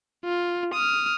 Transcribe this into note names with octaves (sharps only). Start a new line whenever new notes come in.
F4
D#6 F6